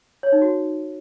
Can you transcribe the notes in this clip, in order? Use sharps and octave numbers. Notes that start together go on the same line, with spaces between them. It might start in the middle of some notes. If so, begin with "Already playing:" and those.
C#5
D#4
F#4